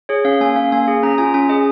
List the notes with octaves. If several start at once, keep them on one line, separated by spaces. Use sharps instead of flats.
G#4 C#5
C#4 F5
A#3 G#5
C#4 F5
A#3 G#5
G#4
C#4 A#5
F4 G#5
C#4 G#5
G#4 D#5